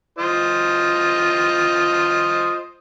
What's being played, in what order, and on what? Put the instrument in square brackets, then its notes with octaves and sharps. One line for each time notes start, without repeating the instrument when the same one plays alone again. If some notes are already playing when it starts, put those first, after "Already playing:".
[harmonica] F4 C5 D#5